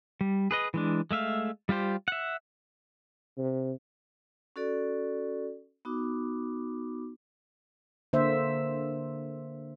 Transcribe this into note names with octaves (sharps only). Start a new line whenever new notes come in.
G3
G#4 B4 D#5
E3 G#3 D4
G#3 A3 E5 F5
G3 F4 G4 C5
E5 F#5
C3
C#4 F#4 A4 D5
B3 D#4 F#4 D6
D3 A#3 C5 E5